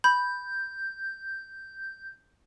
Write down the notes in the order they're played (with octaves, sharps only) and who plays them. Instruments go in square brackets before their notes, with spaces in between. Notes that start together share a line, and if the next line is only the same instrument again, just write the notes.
[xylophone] B5 [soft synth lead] G6